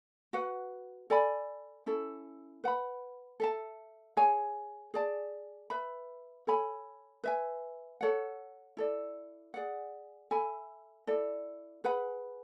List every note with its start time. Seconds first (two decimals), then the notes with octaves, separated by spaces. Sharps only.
0.33 F#4 B4 F#5
1.10 A4 D5 G#5 B5
1.86 C#4 E4 A4
2.64 B4 F#5 B5
3.40 A4 E5 A5
4.17 G#4 C#5 G#5
4.94 G#4 D5 A5
5.70 B4 E5 B5
6.47 A4 C#5 G#5 B5
7.24 B4 E5 G#5
8.01 A4 C#5 F#5
8.77 E4 A4 D5
9.54 G#4 D5 F#5
10.31 A4 E5 G#5 B5
11.07 E4 A4 D5
11.84 G#4 B4 F#5 B5